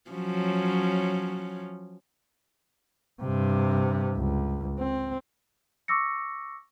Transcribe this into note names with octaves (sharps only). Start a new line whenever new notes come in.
F3 F#3 C#4
G2 C3
C#2
C4
C#6 D6 E6 A#6 C#7